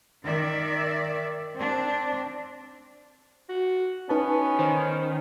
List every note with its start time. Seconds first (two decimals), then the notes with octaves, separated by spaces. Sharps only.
0.23 D#3 D5 E5
1.54 C4 D4
3.49 F#4
4.09 B3 C#4 D#4 B4 A5
4.59 D#3 C5